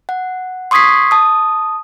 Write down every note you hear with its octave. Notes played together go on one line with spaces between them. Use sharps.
F#5
C6 C#6 D#6 G#6 B6 C7
A5 D#6